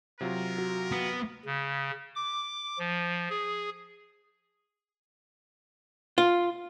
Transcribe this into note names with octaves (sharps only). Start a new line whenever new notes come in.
C3 F#3 F4 A#4
F#4
B3
C#3
D6
F3
G#4
F4